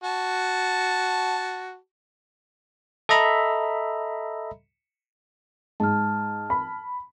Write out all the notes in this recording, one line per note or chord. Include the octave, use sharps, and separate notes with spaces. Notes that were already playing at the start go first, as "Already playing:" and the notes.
F#4 A5
A4 D#5 E5 A#5 B5
G#2 A5 F6
B5